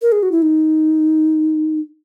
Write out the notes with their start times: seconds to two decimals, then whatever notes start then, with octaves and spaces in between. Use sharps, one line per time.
0.02 A#4
0.12 G#4
0.23 F#4
0.32 E4
0.42 D#4